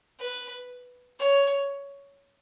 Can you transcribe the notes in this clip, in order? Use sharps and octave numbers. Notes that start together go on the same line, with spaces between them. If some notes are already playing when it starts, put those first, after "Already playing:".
B4
C#5